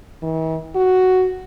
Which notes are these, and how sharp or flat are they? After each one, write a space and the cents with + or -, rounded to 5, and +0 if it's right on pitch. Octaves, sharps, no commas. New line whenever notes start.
E3 -45
F#4 +5